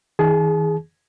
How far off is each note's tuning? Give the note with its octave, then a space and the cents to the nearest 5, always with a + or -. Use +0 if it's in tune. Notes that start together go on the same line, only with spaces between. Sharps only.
D#3 +45 G#4 +0 A5 -40